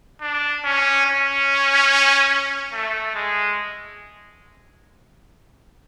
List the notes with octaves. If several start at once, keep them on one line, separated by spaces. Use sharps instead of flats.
D4
C#4
C#4
A3
G#3